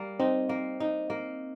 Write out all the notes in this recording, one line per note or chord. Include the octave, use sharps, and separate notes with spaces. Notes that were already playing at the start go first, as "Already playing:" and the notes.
Already playing: G3 A#3
C4 D#4
A#3
D#4
A#3